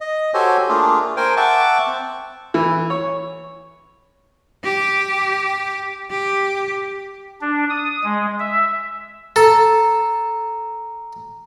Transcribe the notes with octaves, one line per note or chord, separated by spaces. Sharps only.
D#5
F#4 G4 A4 C5 C#5 G#5
A3 A#3 D4 F4 G#4
A#4 C5 G5 G#5
E5 F#5 G5 A5 C#6 D6
C4
E3
C#5
G4
G4
D4
D#6
G#3
E5
A4 A#5